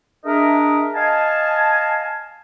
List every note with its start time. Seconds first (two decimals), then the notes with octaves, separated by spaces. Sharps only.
0.25 D4 G#4 A#4 D#5 E5
0.95 D#5 F5 G#5 A5